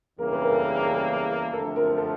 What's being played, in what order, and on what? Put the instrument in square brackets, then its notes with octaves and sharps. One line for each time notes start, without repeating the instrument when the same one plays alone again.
[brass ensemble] E2 C#3 E3 G3 A#3 [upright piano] A#4
[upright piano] B4
A#4
A4
A4
[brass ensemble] D2 C3 F3 [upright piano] A4
[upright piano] A#4
A4